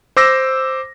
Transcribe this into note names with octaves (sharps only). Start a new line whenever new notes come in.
C5 D6 E6 A#6